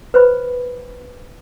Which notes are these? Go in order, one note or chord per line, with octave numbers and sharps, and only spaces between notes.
B4 C5 B5